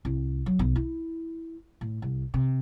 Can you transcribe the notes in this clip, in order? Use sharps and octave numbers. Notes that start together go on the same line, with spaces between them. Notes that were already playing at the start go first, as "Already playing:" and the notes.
C2
F#3
B1
E4
A2
C2
C3